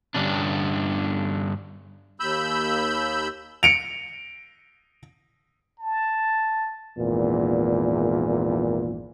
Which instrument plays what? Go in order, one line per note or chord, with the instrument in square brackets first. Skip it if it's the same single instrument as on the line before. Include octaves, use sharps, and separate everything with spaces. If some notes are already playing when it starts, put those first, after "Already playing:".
[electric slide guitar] G2 D3 C#4 D4
[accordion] D#2 B5 E6 G6
[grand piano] C#7 D7 F7
[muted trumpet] A5
[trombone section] G#1 E2 A#2